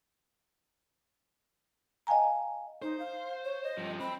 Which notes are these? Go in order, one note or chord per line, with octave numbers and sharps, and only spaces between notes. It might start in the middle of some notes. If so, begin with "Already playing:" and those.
D#5 F5 G5 G#5 A#5
D#4 C5
F5
C#5
D#5
G2 F3
C4 B5